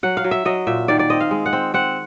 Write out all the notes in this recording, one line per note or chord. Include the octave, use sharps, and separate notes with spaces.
F#3 F#5
F5
F#3
E5
F#3 D#5
A#2 E5
D#3 D5
D5
C4 D#5
F5
G#3
F#5
C4
C4 F#5